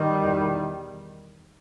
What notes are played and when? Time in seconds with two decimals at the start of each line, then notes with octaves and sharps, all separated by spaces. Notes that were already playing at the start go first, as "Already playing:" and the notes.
Already playing: D#3 G3
0.22 E2 B2